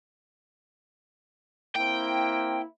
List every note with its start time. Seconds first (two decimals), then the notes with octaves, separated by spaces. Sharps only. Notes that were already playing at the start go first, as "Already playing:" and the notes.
1.76 A#3 C4 E4 G5